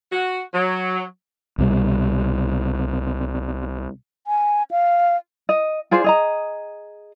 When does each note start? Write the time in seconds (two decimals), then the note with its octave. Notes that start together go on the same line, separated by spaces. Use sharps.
0.12 F#4
0.54 F#3
1.58 C2 B2 F3 G3
4.27 G#5
4.71 F5
5.49 D#5
5.91 F4 G#4 C5 D5
6.04 G#4 D#5 A#5